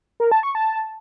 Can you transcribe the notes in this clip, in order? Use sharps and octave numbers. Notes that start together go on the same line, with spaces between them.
A#4
A5
C#6
A5